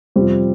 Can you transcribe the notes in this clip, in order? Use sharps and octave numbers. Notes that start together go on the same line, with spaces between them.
F2 C3 F3 G3 C4